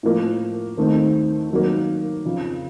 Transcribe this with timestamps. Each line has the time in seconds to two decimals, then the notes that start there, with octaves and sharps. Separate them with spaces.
0.03 A2 F3 A#3
0.77 D#2 D#3 A3 C4 D#4
1.50 D#3 F#3 A#3
2.25 F2 C#3 F3